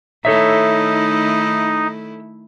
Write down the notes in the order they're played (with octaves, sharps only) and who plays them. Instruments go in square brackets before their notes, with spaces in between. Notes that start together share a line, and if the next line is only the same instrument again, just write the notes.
[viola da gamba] D#3 A3 E4 [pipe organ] D#4 [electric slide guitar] A4 C#5 E5